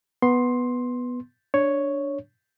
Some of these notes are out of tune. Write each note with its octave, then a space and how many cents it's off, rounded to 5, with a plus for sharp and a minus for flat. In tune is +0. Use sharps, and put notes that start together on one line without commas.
B3 +0 C6 +10
D4 -10 C#5 +0